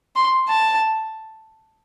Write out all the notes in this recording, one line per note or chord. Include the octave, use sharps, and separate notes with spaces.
C6
A5